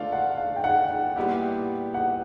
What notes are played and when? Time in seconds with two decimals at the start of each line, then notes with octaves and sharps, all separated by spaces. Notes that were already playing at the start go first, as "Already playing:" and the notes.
Already playing: A3 D4 F4 F5
0.12 F#5
0.38 F5
0.56 G5
0.64 F#5
0.90 F#5
1.16 A#2 G3 B3 E4 G4 F#5
1.94 F#5